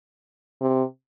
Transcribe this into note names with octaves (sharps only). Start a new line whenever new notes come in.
C3